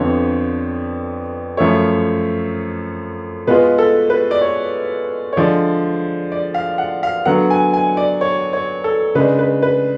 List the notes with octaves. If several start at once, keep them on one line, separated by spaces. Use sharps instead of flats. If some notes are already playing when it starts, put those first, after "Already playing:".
Already playing: F2 D3 F3 B3 C#5
F#2 F3 A3 C#5
B2 G#3 B3 F4 B4
A4
B4
D5
C#5
C#5
D3 F3 G#3 D5
D5
F5
F#5
F5
D3 F#3 B3 F#5
G#5
G#5
D5
C#5
C#5
A4
C#3 G#3 D4 B4
B4
B4